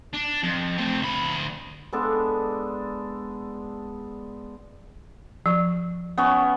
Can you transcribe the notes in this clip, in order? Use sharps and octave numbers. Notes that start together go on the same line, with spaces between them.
D4
F2
A3 C4
D2 B5
G#3 B3 D4 A4
F3 C#6
B3 C#4 C#5